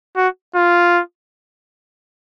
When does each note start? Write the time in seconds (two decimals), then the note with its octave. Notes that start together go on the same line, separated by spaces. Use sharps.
0.17 F#4
0.55 F4